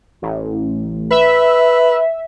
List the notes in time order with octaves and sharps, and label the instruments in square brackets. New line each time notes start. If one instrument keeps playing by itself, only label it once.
[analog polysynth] A1
[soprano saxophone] B4 [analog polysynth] E5